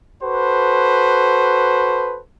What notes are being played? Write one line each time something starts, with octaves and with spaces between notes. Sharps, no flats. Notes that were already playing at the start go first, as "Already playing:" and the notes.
F#4 A4 B4 C5